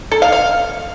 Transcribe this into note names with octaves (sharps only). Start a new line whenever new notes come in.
A4
F5
F5